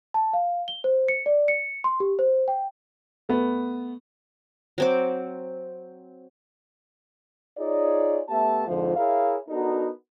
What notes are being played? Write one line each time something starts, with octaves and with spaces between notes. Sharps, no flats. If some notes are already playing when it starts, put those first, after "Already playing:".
A5
F5
G7
C5
C#7
D5
C#7
C6
G4
C5
G5
A3 B3
F#3 C4 D6
D#4 F4 G#4 C#5 D5
A3 B3 G4 E5 A5
F2 G#2 D3 F3
E4 G#4 A#4 C#5 E5 F5
B3 D4 D#4 F#4 A4 A#4